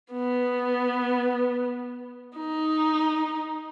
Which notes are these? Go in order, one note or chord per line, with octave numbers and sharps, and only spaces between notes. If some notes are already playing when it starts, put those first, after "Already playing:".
B3
D#4